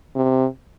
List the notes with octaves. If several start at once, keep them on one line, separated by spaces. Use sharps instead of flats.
C3